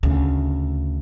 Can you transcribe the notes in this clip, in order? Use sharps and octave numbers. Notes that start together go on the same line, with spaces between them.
D2 C#3